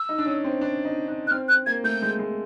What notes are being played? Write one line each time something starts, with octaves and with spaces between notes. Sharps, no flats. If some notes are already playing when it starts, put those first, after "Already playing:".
Already playing: E6
D#4
D4
C#4
C4
D4
D#4
D4
F#6
C4 F6
F#6
A#3 G#6
A3 G6
G#3
G#3